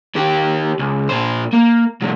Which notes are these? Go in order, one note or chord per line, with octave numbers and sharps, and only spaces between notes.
D#3 G4
C#2
A#2 C5
A#3
C2 A2